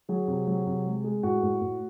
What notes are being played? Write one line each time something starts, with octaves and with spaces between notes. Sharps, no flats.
F#3 G#4
C3
F#3
C3
G#3
G#3
A2 F#4
A2
A2